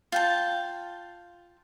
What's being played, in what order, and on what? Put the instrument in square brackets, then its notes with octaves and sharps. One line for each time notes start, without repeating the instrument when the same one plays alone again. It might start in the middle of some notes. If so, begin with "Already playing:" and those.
[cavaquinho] F4 G5 A5